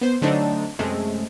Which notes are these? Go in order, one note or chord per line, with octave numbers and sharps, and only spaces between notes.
B3 C5
D3 F#3 A3 C4 D4 D#4
F#2 C3 G#3 A3